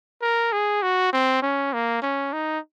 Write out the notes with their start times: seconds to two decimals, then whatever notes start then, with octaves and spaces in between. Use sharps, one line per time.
0.22 A#4
0.52 G#4
0.82 F#4
1.13 C4
1.42 C#4
1.73 A#3
2.02 C#4
2.33 D#4